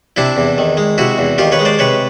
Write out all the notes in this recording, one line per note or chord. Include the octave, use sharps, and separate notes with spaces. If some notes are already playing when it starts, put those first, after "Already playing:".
C3 D4 E4
E2
D#3
G#3
C3 E4 F#4
E2
D#3 F4 G4
B4 C#5
G#3
C5 D5
C3 B4 C#5